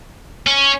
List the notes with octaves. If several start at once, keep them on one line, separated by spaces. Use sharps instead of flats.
C#4